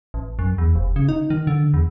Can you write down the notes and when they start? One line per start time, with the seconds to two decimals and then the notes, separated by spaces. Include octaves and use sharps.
0.14 A1
0.39 F#2
0.58 E2
0.75 F1
0.96 C#3
1.09 D#4
1.30 D#3
1.47 D3
1.74 E2